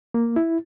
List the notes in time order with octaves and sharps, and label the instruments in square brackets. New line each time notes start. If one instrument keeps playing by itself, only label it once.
[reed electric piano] A#3
E4